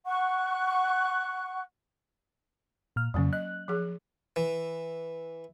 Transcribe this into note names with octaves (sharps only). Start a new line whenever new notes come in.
F#5 C#6 F#6
A#2 F6
F2 C#3 F#3 A#3 C#4
D#5 F#6
F3 G#4
E3